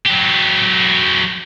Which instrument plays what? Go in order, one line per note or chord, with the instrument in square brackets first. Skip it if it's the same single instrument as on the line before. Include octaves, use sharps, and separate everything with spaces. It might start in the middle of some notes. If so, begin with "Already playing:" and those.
[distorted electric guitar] F#3 G4